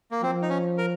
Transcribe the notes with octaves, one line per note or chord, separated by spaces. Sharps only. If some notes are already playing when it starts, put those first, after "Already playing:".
A#3
F3 C4
D#4
C#4
A#4